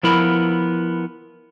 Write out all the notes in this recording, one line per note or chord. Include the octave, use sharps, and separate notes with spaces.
F3 B3 E4 A#4 B5